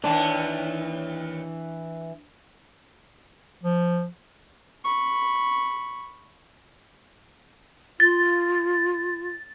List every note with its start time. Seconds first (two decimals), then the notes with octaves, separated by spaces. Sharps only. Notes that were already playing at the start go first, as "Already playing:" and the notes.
0.04 D#2 E3 B3 D4
3.63 F3
4.85 B5 C#6
8.00 F4 A6